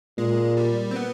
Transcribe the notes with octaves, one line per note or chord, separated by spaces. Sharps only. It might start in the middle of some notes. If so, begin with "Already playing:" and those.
A#2 G#3
G3
C4
B3